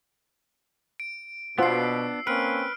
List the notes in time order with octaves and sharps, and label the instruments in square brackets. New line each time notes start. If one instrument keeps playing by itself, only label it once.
[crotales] D7
[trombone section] B2 [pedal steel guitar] B3 D4 [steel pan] F4 C5 F#5 [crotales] E6 C7
[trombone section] A#3 C4 C#4 [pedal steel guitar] B4 [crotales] F6 D7